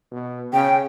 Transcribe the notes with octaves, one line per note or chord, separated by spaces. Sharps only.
B2
C#3 G5